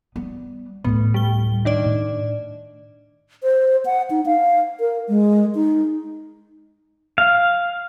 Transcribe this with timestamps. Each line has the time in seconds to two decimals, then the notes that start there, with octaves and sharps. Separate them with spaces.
0.16 G3 B3
0.84 D2 A2 B3
1.14 G3 G7
1.65 D#3 D4 D5
1.84 A2
3.43 C5
3.86 F#5
4.10 D#4
4.26 F5
4.80 A#4
5.09 G#3
5.55 D#4
7.18 F5